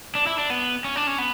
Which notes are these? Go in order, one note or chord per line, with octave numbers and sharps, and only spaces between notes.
D4
E4
D4
B3
C#4
D4
C#4
B3